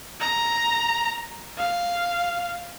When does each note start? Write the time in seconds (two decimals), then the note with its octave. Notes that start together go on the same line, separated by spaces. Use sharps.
0.20 A#5
1.57 F5